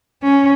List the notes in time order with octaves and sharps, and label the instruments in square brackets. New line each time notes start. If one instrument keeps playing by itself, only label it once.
[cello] C#4